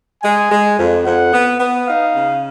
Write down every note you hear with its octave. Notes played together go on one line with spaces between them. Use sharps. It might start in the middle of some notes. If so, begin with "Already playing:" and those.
G#3 G#5
G#3
F2
F2 F#5
B3
B3
D#4 F5
C#3